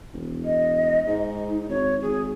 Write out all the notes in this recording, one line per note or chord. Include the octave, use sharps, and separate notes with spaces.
E1
D#5
G#2 D#4
G#1 C#5
G#1 G#4